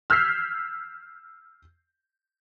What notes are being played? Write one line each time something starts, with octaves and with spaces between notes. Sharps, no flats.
E6 F6 G6 G#6 B6 C7